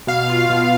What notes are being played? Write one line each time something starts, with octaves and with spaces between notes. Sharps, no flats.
B2 F5
F4
B2